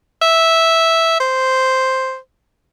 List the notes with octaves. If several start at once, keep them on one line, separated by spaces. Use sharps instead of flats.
E5
C5